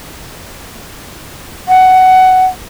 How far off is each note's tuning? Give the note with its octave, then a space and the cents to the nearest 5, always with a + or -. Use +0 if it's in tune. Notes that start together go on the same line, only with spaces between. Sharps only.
F#5 +15